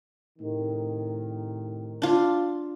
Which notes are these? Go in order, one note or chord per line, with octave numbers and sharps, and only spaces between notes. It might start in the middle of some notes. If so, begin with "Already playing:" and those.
A2 C3 D#3
D4 F4